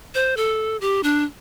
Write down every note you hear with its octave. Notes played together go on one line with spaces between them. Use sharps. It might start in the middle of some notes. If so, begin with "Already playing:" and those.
C5
A4
G4
D4